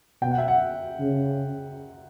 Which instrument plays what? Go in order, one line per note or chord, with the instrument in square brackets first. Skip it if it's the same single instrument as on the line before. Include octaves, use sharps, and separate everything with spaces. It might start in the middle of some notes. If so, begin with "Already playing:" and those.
[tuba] B2 [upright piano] G5
[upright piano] F#5
E5
F#5
[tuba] C#3